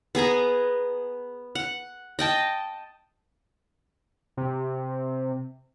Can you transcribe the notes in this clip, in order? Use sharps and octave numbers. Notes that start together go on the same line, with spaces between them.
B3 G#4 G#5 A#5
F#5
D#5 G5 A5
C3